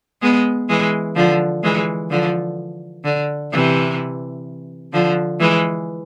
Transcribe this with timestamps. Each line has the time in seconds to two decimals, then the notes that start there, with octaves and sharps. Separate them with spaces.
0.22 G#3 B3
0.69 E3 G#3
1.16 D3 F3
1.63 E3 G#3
2.10 D3 F3
3.04 D3
3.52 C3 E3
4.93 D3 F3
5.40 E3 G#3